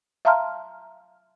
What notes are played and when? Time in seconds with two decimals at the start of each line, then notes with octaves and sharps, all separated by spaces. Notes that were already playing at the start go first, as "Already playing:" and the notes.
0.25 E5 F5 A5 A#5 C6 F6